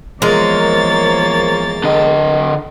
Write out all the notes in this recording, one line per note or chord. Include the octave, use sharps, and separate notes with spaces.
E2 F3 G#3 A#3 A#4 C5 C#5 A6
D3 D#5